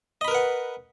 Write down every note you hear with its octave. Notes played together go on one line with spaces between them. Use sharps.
A#4 B4 D#5 F#5 B5